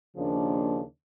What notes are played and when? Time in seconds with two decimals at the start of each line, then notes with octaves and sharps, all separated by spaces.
0.16 D#2 C#3 F3 A#3 D4